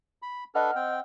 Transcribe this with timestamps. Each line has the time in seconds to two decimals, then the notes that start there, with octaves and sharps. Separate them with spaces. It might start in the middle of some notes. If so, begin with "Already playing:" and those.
0.22 B5
0.55 D4 A4 B4 D#5 F#5 F6
0.75 C4 G5